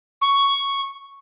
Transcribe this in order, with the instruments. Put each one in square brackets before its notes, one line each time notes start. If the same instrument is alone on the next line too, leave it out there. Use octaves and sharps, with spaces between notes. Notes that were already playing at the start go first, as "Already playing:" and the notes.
[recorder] C#6